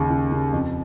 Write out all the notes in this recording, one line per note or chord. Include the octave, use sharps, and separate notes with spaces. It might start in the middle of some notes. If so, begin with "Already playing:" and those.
Already playing: D#2 C#3
C#3
C#3
F2